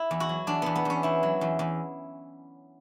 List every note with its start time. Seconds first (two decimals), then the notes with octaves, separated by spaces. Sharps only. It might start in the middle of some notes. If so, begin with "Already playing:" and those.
Already playing: E4
0.11 E2
0.20 F#4
0.29 F#3
0.47 E2 D4
0.62 E2 B3
0.76 B3
0.85 E2 C#4
1.03 E2 E4
1.23 F#3
1.41 E2
1.59 E2